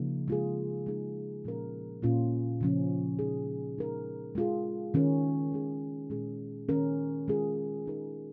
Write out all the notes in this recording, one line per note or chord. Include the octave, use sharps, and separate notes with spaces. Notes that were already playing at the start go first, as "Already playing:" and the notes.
Already playing: C#3 F3 A#3 D#4
G#3 F4 G#4
G#3 D#4 G#4
A#2 F3 A#3 C#4 A#4
A#2 A#3 C#4 F4
C#3 F3 C#4
F3 G#3 D#4 G#4
G#3 D#4 A#4
G#3 F4 G#4
D#3 C#4 A#4
D#3 G#3 D#4 G#4
A#2 G#3 C#4 G#4
D#3 C#4 A#4
D#3 G#3 F4 G#4
G#3 D#4 A#4